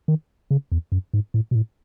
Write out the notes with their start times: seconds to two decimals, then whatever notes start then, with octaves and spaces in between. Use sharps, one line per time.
0.08 D#3
0.51 C#3
0.72 E2
0.92 F#2
1.14 G#2
1.34 A2
1.51 B2
1.55 A2